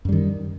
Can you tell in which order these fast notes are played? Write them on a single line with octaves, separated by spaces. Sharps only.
F#2 G3 D#3